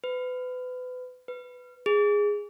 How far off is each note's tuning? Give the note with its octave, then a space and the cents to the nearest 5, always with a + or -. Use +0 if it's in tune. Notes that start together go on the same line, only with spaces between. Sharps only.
B4 +30
B4 +10
G#4 -10